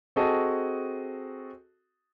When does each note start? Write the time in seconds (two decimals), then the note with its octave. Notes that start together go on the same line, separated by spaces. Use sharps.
0.16 C4 F#4 G#4 A4 D#5 A5